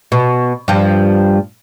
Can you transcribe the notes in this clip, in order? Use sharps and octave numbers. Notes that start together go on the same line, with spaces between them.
B2
G2 F3